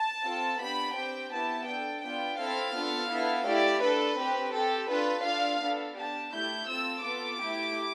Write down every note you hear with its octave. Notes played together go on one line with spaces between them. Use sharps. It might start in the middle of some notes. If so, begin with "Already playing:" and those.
Already playing: A5
C4 F4 A4
B3 D4 G4 B5
C4 G4 G5
B3 E4 G4 A5
D4 A4 G5
B3 D4 F4 G5
C4 E4 A4 F5
B3 D4 F4 A4
B3 E4 A4
A3 E4 G4 D5
D4 A4 B4
C4 G4
C4 G4 A4
D4 F4 A4 B4
D4 F4 A4 F5
B3 D4 A4
D4 G4 A5
A3 E4 G4 G6
C4 F4 A4 E6
B3 F4 A4 D6
A3 E4 G4